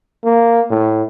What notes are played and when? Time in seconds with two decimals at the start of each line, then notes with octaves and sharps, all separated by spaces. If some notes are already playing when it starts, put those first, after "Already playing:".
0.24 A#3
0.70 A2